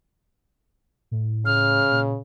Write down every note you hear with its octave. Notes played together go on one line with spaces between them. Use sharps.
A2
C#3 F6
A#2